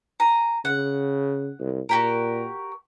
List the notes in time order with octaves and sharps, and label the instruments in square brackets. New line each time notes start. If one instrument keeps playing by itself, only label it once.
[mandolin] G#5 A#5
[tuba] C#3 [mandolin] F#5
[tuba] C2
[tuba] A#2 [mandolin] F#4 G4 A#4